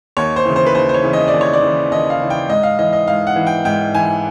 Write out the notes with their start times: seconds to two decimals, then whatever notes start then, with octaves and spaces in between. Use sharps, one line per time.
0.17 D#2 C#5
0.36 C5
0.46 C#3 E3
0.56 C5
0.66 B4
0.75 D#2 C5
0.89 C5
0.94 C#5
1.04 C#3 E3
1.13 D#5
1.28 D5
1.34 D#2
1.41 C#5
1.53 D5
1.62 C#3 E3
1.91 D#2 D#5
2.10 F5
2.21 C#3 E3
2.30 G5
2.49 G#2 D#5
2.63 F5
2.79 E3 D#5
2.93 D#5
3.08 G#2 F5
3.27 F#5
3.36 E3
3.47 G5
3.65 G#2 G5
3.95 E3 G#5